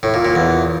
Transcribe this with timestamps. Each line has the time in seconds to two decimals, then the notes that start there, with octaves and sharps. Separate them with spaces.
0.03 A2
0.14 A#2
0.25 A#2
0.35 E2